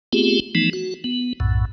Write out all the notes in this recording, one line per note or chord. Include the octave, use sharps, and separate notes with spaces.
A3 B3 C4 F4 G4 G#4
E3 F3 A3 B3 D#4
F#4
B3
B1 F#2 A2